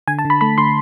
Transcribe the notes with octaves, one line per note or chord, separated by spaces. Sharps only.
D3 G#5
A5
D3
B5
A3 B5
D3 C6